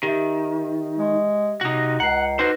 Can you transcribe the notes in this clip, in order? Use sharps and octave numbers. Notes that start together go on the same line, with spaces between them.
D#3 G4 E5
G#3
C3 D#4 F#4
C#2 F#5 A#5 C7
D#4 F#4 B4 C5